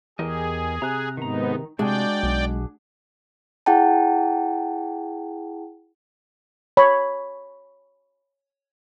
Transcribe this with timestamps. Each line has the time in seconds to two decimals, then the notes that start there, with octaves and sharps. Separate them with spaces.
0.19 E2 G4 G#4 A#4 D#5
0.82 C3 A#5 F#6
1.17 G#2 D#3 B3 D#4 A#5
1.79 C3 G#3 D4 F#4 G#4 D5 G5
2.23 B1
3.66 E4 G#4 F#5 G5 A5
6.77 C#5 B5